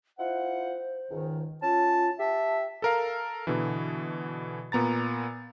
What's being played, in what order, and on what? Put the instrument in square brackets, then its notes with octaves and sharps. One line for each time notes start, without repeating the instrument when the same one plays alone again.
[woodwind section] E4 F4 F#5 [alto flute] C5
[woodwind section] C#2 G#2 D#3
[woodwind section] C#4 A5 [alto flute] F4
[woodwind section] G4 E5 [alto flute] A5
[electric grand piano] A4 A#4 F5
B2 D3 E3
A#2 B3 A#5 A6